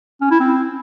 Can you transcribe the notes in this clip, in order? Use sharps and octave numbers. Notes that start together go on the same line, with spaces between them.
C#4
E4
C4